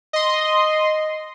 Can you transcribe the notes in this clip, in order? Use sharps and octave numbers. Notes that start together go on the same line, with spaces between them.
D#5 C6